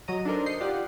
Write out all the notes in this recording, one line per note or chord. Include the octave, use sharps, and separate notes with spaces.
F#3 C#5 D#5 A#5 D#7
D4 D#4 A4 A#4 C5
D#5 D#6 G6 C7 C#7
F4 G4 D5 D#5 F#5